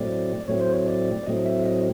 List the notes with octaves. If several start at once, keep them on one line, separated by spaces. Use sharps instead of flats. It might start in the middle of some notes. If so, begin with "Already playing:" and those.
Already playing: A2 F#3 A3 C4 D5
A2 F#3 A3 C4 C#5
C5
C#5
D5
A2 F#3 A3 C4 D#5
E5
D#5